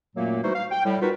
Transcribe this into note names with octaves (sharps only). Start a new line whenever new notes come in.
F#2 A#2 F#3 A3 A#3
E3 G3 A3 D#4 F#4 C5
F5
G5
A2 G3
B3 D#4 F4 F#4 A#4 B4